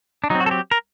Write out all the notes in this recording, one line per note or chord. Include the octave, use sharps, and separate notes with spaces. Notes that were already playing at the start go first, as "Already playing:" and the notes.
D4
F#3 C4 D#4
F#4
A4
G4
A#4